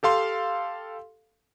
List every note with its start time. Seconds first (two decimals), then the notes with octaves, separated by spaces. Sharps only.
0.03 G4 A4 F5 C6